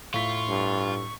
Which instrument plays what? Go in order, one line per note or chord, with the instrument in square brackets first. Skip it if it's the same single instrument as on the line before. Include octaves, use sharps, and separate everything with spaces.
[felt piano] A2 B6 [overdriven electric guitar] F4 [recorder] C#6
[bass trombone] G2